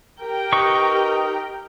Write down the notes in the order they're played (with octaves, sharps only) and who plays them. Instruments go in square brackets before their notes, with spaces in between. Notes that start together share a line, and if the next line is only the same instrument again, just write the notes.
[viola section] G4 A#4 G5
[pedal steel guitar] D#4 B4 C#6